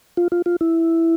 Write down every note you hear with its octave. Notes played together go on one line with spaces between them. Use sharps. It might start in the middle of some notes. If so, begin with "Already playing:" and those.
F4
F4
F4
E4